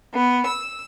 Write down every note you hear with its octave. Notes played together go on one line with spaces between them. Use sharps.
B3
E6